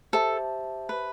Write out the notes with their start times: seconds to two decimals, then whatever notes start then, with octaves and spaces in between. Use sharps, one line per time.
0.13 G4 A4 C5 E5 A5
0.89 B4